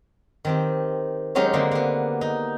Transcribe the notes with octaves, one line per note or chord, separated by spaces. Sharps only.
D#3 C4 G4
F#3 G#3 C#4 D#4 G4
D3 G3 G#3 A#3 C4
A#3 B3
D#4